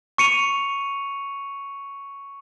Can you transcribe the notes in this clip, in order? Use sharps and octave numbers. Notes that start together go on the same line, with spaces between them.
C#6 C#7 D#7 F7